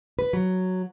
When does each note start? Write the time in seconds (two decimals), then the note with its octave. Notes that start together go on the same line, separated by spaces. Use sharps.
0.19 B4
0.33 F#3